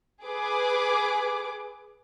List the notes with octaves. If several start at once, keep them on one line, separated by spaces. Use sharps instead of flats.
G#4 B4 D6